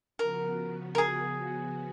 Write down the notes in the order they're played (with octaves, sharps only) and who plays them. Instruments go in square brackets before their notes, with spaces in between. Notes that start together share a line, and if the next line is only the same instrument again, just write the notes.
[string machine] C#3 F3 B3 F#4 [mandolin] A#4
[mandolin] A#4
G#4